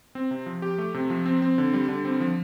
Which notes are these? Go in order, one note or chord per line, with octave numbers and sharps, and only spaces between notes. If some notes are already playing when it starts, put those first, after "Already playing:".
C4
C3
F3
G4
A3
C3
F3
C4
C4
D3
G3
D3
C4
F3